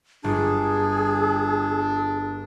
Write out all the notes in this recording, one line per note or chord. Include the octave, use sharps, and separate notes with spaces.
G1 D4 G#4